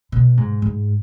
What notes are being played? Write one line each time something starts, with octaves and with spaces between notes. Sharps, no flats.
B2
G#2
G#2